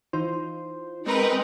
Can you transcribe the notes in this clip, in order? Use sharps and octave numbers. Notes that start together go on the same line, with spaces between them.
E3 D#4 F4 C5
G#3 C4 D#4 A#4 B4